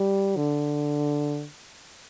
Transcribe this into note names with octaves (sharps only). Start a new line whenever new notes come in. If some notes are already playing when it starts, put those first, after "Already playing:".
Already playing: G3
D3